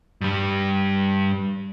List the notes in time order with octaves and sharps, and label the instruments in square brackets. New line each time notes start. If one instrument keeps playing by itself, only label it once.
[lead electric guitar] G2 G3